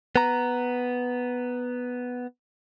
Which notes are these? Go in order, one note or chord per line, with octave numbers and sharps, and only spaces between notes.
B3 A#5